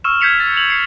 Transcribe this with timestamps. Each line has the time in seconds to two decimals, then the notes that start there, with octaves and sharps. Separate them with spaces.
0.04 C#6 E6 F6 E7
0.21 G6 G#6 B6 C#7 F7
0.40 A6
0.57 F7 F#7
0.69 F6 C7 C#7 F7